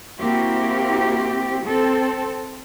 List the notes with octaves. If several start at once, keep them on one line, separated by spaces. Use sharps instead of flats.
A#3 C4 E4 F#4 G4
C4 A4